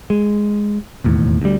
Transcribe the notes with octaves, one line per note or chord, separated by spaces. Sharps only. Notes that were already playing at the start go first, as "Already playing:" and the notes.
G#3
E1 D#2 A2
D2 G3